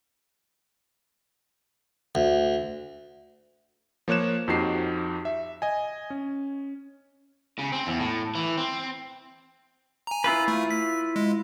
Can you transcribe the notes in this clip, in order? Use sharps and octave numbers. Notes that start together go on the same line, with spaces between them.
D2
F3 A#3 C#5 F#6 E7
F2 F3 D#4 F#4 G4 C7
E5
D#5 G#5
C#4
C#3
C4
E2
A2
E3
C4
G#5 A#5
E4 F4 B4
A3
B6
G#3